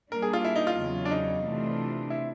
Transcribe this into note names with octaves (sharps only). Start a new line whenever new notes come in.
G3 A#3 D4 A#4
G#4
F4
E4
D#4
F4
E2 C#3 F#3
D4
D#4
C3 E3 A3 D4 F4
E4